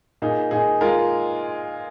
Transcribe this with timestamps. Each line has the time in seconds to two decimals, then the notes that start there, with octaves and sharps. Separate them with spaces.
0.22 A#2 D#4 G#4
0.51 A#2 D#4 G#4
0.81 G#3 F4 A#4